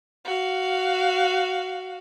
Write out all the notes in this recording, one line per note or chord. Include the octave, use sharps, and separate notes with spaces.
F#4 F5